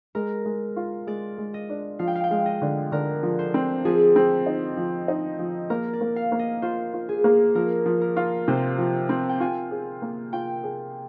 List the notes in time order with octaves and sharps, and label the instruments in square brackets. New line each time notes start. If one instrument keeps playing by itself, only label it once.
[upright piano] G#3 [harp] A#4
[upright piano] G#3
F4
[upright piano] G#3 [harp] D5
[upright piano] G#3
[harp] D#5
[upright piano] D4
[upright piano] F3 [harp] F5
[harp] G5
F5
G5
[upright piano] G#3 [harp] F5
[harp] D#5
[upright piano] D3
[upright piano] D3 [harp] A#4
[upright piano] F3
[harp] C5
[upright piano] C4
[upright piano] F3 [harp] G#4
[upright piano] C4
D#4
F3
D#4
F3
[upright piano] A#3 [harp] A#4
[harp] D5
[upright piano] A#3
[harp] F5
[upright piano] A#3
[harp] D#5
[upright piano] F4 [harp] C5
[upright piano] F4
[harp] G#4
[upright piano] A#3
[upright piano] F3 [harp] A#4
[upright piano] F3
[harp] A#4
[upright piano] F4
[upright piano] C3 [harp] C5
[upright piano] F3
C4
[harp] G5
[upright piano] F4 [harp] G#5
[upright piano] G#4
A#3
[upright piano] F4 [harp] G5
[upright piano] G#4